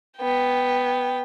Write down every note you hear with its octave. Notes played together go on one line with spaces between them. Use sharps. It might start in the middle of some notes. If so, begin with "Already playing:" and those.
B3 G5